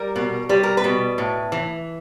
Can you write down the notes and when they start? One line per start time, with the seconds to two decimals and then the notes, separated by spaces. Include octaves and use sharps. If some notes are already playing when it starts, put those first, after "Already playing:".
Already playing: G3 A#4
0.16 B2
0.49 G3 B4
0.63 A#4
0.77 B4
0.84 B2
1.18 A2
1.52 E3